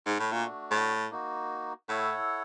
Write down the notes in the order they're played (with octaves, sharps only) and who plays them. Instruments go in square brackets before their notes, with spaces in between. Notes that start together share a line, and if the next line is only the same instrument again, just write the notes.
[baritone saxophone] G#2
A2
[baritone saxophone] A#2 [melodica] A3 D4 F#4
[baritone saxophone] A2
[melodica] A#3 D#4 F#4
[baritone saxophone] A2 [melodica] E4 A4 C#5 F#5